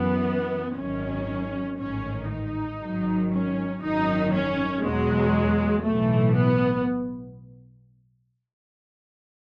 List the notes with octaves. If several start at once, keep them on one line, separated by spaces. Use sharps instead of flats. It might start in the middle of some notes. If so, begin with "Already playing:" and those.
Already playing: F#2 E3 B3
G#1 F#2 D#3 F#3 C#4
A1 G#2 D#3 C#4
D#4
G#1 G#2 D#3 F#3
C#4
G#1 F#2 D#3 F#3 D#4
C#4
E2 B2 F#3 G#3
B1 A2 E3 A3
B3